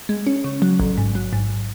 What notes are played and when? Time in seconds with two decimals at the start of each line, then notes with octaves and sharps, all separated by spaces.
0.09 G#3
0.27 C#4
0.44 C#3
0.62 F#3
0.80 A1
0.98 G#2
1.15 F#3
1.33 G#2